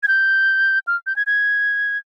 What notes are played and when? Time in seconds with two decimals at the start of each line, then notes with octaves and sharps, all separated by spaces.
0.03 G#6
0.08 G6
0.87 F6
1.07 G6
1.16 G#6
1.27 G#6